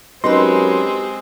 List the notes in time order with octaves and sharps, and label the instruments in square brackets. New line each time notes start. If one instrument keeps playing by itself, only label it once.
[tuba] F#2 [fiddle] G#3 C4 [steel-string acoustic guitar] D#4 G4 B4 [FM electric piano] C6